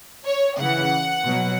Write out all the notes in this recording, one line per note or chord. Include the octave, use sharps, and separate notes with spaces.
C#5
C#3 E3 F#5
B2 F#3